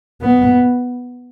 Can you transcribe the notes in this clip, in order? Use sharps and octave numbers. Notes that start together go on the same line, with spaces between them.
B3